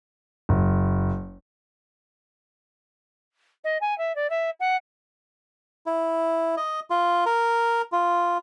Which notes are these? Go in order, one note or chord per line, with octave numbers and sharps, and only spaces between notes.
F#1
D#5
G#5
E5
D5
E5
F#5
E4
D#5
F4
A#4
F4